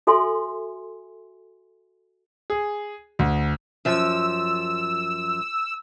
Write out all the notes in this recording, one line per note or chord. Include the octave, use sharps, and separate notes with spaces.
F#4 A4 E5 G#5 C6
G#4
D2
F#2 F3 E6